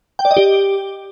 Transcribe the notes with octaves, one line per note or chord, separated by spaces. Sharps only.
G5
D5
D#5
G4